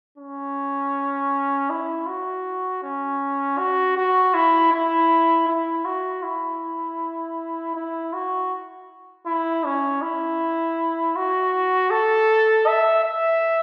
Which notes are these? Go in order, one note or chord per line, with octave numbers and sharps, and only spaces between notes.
C#4
E4
F#4
C#4
F#4
F#4
E4
E4
E4
F#4
E4
E4
F#4
E4
C#4
E4
F#4
A4
E5
E5